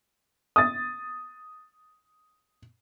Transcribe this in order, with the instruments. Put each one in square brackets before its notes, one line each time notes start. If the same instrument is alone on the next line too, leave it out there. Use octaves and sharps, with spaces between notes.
[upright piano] D#6 A6